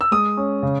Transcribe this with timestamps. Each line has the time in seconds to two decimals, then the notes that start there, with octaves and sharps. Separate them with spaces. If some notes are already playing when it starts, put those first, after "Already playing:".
0.01 E6
0.11 G#3 D#6
0.37 C#4
0.63 C#3